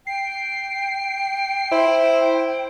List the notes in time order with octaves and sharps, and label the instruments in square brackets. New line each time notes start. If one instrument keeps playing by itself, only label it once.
[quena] G5 [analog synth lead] C7
[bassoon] E4 [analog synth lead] C5